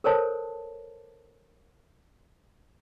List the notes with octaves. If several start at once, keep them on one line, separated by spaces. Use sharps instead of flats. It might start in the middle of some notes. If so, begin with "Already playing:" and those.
A4 A#4 C5 C#5 A5